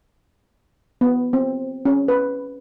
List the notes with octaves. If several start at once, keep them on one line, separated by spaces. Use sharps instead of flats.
B3
C4
C#4
B4